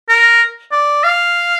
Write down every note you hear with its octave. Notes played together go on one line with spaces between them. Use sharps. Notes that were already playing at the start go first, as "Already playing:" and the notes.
A#4
D5
F5